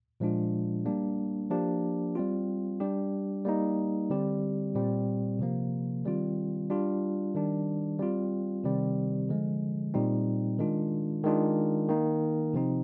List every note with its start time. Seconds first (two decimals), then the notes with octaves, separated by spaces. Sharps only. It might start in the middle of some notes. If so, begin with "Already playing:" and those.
0.20 A#2 F3 G#3 D4 F4
0.86 G3 A#3 D4
1.50 F3 A#3 D4 G4
2.15 G3 C4 F4
2.80 G3 D4 G4
3.45 G3 A#3 D#4
4.10 D3 G3 C4 G4
4.75 A#2 G3 C4
5.39 C3 F3 A#3
6.05 D#3 G3 C4 F4
6.70 G3 D4 F4
7.34 D#3 G3 D4
7.99 G3 C4 F4
8.64 C3 D#3 G3 C4
9.29 D3 F3 G#3
9.94 A#2 G3 C4 D#4
10.59 D#3 G#3 D4 F4
11.24 D#3 G#3 D4 F4
11.88 D#3 A#3 D#4
12.54 C3 F3 C4 D#4